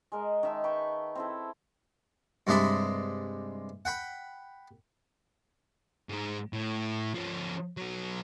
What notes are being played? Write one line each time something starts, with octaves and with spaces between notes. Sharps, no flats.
G#3 A#4 D#5
D#3 E5 A5
B4 G5 B5 C#6
C4 E4 A4
G2 C3 G#3 D4 D#5 B5
F#5 G5 B5
G#2 G#3
A2
F3 C#4
F#3 B3